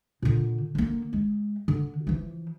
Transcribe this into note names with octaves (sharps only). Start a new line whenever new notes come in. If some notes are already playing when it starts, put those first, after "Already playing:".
A#2 D3
D3 A#3
G#3
D3
E3 F3